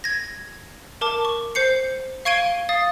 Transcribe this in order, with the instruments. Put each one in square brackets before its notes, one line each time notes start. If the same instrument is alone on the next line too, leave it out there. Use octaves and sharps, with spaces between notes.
[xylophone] G#6 A#6
A#4 A5 D6
C#6
C5 G6 C7 C#7
F5 C#6 G#6 D7 D#7 G7
F5 D#6 A6